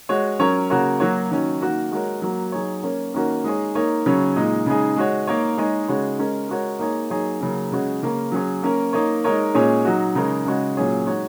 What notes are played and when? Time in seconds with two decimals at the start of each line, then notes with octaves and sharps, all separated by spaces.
0.09 G#3 F#4 C#5
0.39 F#3 C#4 A#4 C#5
0.70 C#3 A#3 F#4 A#4 C#5
1.00 F#3 A#3 F#4 C#5
1.30 D#3 F#3 C#4
1.61 D#3 A#3 F#4 A#4
1.92 G#3 F#4 A#4 C#5
2.22 F#3 A#3 F#4
2.52 F#3 D#4 G#4 C#5
2.83 A#3 C#4 A#4 C#5
3.14 D#3 A#3 C#4 F#4 A#4
3.44 G#3 D#4 G#4 C#5
3.75 A#3 D#4 A#4 C#5
4.06 C#3 F#3 C#4
4.36 A#2 G#3 D#4
4.66 C#3 G#3 D#4 G#4
4.96 G#3 F#4 C#5
5.27 A#3 D#4 A#4 C#5
5.58 G#3 D#4 G#4 C#5
5.88 C#3 G#3 F#4 C#5
6.19 G#3 C#4 A#4 C#5
6.49 G#3 F#4 A#4 C#5
6.79 A#3 D#4 G#4 C#5
7.10 F#3 A#3 D#4 G#4 C#5
7.41 C#3 F#3 A#3 C#4
7.72 C#3 G#3 F#4 C#5
8.02 C#3 A#3 C#4 A#4
8.32 F#3 C#4 G#4 C#5
8.63 A#3 C#4 A#4
8.93 A#3 D#4 A#4 C#5
9.24 G#3 D#4 A#4 C#5
9.55 A#2 G#3 C#4 G#4 C#5
9.85 F#3 D#4 F#4
10.15 C#3 G#3 D#4 A#4 C#5
10.46 C#3 G#3 F#4 C#5
10.77 A#2 F#3 C#4 G#4 C#5
11.06 G#3 D#4 F#4 C#5